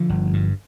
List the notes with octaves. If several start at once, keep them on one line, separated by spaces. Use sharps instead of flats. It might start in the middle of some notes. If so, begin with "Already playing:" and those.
Already playing: D3 F3
G1
G2